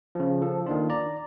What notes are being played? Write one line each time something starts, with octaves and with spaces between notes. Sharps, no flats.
C#3 F3
F3 A4
D#3 A#3 D4 F4
D5 A#5